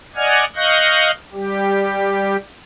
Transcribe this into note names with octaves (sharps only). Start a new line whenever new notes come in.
D5 D#5 F#5 G#5 F6 G#6
D#5 F5 C#6 F#6 G6 A#6
G3 G4